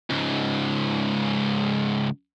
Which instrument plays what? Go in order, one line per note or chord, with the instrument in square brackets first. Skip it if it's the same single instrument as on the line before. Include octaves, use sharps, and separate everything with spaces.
[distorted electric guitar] C#2 G#2